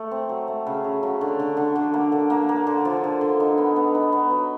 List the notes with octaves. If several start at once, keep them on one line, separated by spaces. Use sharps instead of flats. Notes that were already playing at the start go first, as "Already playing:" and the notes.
Already playing: A3
C4
F#3
A3
C#3
C#3
F#3
D3
D3
D3
D3
A#3
D3
A#3
A#3
D3
F3
D3
D3
D#4
B3
B3
D#4
B3
F#3